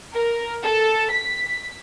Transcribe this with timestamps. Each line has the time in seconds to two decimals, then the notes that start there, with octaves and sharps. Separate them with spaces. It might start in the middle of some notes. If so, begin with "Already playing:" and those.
0.14 A#4
0.63 A4
1.11 B6